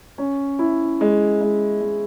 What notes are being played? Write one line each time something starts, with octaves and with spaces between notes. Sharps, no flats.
C#4
E4
G#3
G#3
G#3